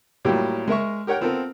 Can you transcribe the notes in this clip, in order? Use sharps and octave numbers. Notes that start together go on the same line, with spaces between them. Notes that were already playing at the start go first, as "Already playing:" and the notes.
A2 F#3 G3 A#3 F4 G4
G#3 A#4 E5 C#6
G4 A#4 C#5 F#5 G5
B3 C4 F4 A4 A#4